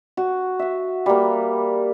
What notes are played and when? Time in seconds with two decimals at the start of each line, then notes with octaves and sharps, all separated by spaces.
0.17 F#4
0.59 E5 F#5
1.06 G3 A#3